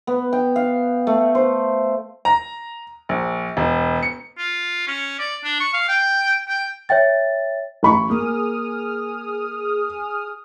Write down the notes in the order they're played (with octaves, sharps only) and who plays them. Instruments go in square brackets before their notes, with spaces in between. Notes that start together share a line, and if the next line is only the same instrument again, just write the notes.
[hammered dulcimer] B3
G5
F5
A3
C5
[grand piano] A#5
A#1
E1
C#7
[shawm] F4
C#4
D5
D4
C#6
F5
G5
G5
[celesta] C#5 E5 G5 A6
[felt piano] A1 B5 C#6
[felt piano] A#3 [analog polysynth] G#4 D#6 F6